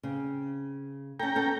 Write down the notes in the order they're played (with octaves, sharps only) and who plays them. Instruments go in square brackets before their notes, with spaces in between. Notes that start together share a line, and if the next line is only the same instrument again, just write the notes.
[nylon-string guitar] C#3 C4
[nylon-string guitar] C#4 A4 [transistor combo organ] G5 A#5
[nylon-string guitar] B3 C#4 A4